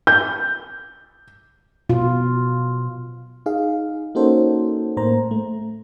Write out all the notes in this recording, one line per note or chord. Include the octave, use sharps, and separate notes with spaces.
G6
B2 F4
D#4 G#4 F5
A#3 C#4 D#4 F#4 A4 C5
A2 A#3 C5 A#5
A3